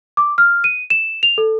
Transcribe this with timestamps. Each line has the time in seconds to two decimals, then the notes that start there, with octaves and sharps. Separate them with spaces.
0.17 D6
0.38 F6
0.64 D#7
0.90 E7
1.23 F7
1.38 A4